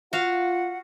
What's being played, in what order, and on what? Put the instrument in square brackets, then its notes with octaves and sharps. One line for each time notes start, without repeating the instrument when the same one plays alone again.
[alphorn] F4 [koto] F#4 F5 [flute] F#5